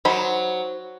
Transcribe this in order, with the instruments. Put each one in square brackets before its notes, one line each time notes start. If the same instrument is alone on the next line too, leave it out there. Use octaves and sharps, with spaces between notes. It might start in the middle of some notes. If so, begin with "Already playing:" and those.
[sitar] F#3 [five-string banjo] D#4 C5 B5